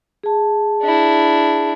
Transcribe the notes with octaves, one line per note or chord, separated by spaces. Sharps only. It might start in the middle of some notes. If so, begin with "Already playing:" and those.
G#4 A5
D4 E4